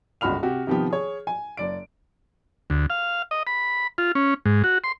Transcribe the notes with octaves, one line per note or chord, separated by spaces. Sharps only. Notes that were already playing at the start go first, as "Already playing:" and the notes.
G1 C#2 F#4 B5 F6 F7
C3 F#4 G4
C3 D#3 F3 B3 G4
G#4 C#5
G#5
F#1 D5 D7
D2
F5
D#5
B5
F4
C#4
G#2
F#4
C6